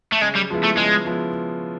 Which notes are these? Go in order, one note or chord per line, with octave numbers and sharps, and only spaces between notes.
A3
C#3 G#3
G3
F3 G#3 B3 E4
A3
C#3 G#3
F3 G#3 B3 E4